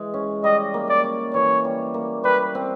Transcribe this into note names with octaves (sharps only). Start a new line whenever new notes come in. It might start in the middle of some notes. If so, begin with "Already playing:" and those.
Already playing: E3 G#3
C#4
G3 D#5
A#3
D5
C#4
E3 C#5
G3
A#3
G3 B4
C4